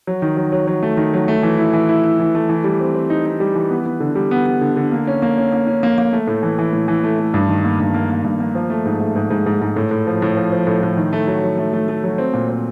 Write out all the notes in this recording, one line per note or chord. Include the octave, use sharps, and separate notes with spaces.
F#3
D#3
F#3
F#3
F#3
A3
D#3
F#3
A3
E3
E4
E3
E4
E4
E3
A3
E3
G3
C4
C4
D#4
D#4
G3
E3
B3
B3
D3
G3
B3
B3
D3
D3
A#3
C#4
A#3
C#4
A#3
C#4
A#3
A#3
A3
A2
E3
E3
A2
E3
A3
A3
G2
D#3
A#3
G2
A#3
A#3
G2
A#3
F3
A3
G#2
A3
G#2
G#2
G#2
G#2
A2
A2
F3
A2
F3
F3
A2
A2
D#3
A3
F#3
F#3
A3
A3
A3
F#3
C4
A#2
C4